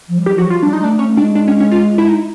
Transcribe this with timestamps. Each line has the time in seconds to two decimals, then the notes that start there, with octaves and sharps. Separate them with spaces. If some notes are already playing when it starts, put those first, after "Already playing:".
0.08 F3
0.18 G3
0.26 F#3 G4
0.36 F3 F#4
0.44 F#3
0.50 F4
0.62 G3 D4
0.73 D#4
0.81 A3 D4
0.99 A3 C#4
1.16 G#3 D4
1.35 D4
1.47 C#4
1.60 C#4
1.71 F4
1.98 E4
2.08 D#4